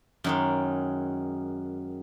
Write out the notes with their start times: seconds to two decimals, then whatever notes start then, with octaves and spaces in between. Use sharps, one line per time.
0.24 F#2 D#3 G#3